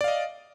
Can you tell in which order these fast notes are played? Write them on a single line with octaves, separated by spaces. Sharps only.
D5 F5 D#5